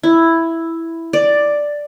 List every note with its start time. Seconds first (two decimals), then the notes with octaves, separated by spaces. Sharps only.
0.03 E4
1.13 D5